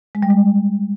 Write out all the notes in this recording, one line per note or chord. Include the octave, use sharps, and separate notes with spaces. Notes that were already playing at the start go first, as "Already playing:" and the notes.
G#3
G3
G#3